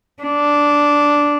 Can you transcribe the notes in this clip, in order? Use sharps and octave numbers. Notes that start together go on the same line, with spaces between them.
D4